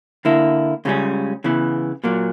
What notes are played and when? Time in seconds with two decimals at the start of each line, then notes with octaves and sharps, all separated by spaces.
0.25 D3 A#3 E4
0.85 C#2 C#3 G3 C#4
1.44 C#3 E3 B3
2.04 A#2 F#3 A#3